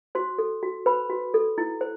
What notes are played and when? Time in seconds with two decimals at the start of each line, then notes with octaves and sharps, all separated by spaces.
0.15 F#4 C5 C6
0.38 A4
0.63 F#4
0.86 B4 C5 B5
1.10 F#4
1.34 A4
1.58 E4
1.81 C5